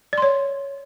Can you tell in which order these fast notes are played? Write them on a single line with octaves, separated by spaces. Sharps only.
D5 C6 C#5